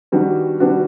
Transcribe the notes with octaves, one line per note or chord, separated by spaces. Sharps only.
D#3 G3 B3 D4 F#4
D#3 G3 B3 D4 F#4